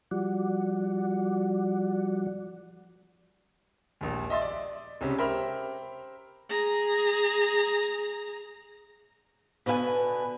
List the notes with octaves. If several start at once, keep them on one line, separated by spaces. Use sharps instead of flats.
F3 G3 F#4 D5 F#5
A#1 D#2
D#5 E5 C6 A6
D5
C#2 C3 C#4
G4 A#4 C5 E5 B5 F6
G#4 A#5
B2 D3 B4 E5 G#5